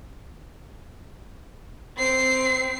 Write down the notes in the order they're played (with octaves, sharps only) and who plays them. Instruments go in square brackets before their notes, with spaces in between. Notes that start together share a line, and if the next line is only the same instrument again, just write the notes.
[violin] C4 C7